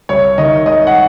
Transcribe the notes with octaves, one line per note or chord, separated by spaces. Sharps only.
C2 C#5
D#3 D#5
G#3 D#5
F#5